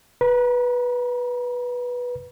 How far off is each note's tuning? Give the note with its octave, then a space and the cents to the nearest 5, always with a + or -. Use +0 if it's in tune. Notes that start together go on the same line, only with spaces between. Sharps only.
B4 -10 A#5 +35